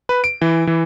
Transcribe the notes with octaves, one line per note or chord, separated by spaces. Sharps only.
B4
D7
E3
E3